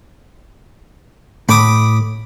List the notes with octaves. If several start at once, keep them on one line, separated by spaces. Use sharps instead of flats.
A2 B5 D6 D#6